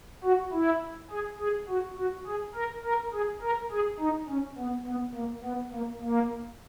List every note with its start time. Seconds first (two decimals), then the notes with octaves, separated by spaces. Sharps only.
0.24 F#4
0.53 E4
1.11 G#4
1.40 G#4
1.69 F#4
1.97 F#4
2.26 G#4
2.55 A#4
2.84 A#4
3.13 G#4
3.42 A#4
3.71 G#4
4.00 D#4
4.29 C#4
4.58 B3
4.87 B3
5.15 A#3
5.44 B3
5.73 A#3
6.02 A#3